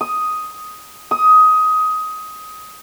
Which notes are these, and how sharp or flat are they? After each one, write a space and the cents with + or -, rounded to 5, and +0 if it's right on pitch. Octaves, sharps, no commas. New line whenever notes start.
D#6 +5
D#6 +15